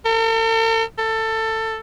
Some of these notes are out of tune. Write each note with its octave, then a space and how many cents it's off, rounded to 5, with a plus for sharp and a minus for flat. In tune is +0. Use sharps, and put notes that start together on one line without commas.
A4 +45
A4 +20